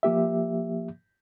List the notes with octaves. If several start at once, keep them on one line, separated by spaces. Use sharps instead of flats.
F3 A#3 G4 E5